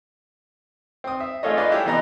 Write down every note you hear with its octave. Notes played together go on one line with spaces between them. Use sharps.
C4 D#6
E5
A3 F4 G#4 A4 C#5 D#5
D4 D#4 F4 B4 D5 D#5
E4 G4 G#4 C#5 D5
C3 E3 B3 D#5 A#5